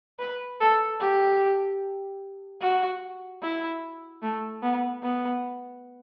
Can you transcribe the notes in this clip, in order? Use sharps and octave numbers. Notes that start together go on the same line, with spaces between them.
B4
A4
G4
F#4
E4
A3
B3
B3